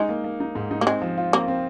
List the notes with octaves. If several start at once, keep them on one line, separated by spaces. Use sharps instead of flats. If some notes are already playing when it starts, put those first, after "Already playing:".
Already playing: G#3 D#4
A#3
A#3
D#4
G#2
D#4
A#3
G#3 C4
F3
F4
A#3 C4
C4